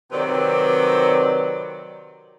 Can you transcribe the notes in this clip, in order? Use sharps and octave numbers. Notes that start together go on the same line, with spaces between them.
C3 D#3 F#3 C4 B4 D5